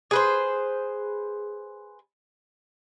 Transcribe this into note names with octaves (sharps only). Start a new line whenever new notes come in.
G#4 B4 C5